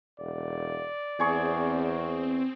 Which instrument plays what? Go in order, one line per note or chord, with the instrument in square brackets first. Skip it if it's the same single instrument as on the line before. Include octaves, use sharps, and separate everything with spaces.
[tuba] E1 [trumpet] D5
[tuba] E2 [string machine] C4 [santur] G#4 C#6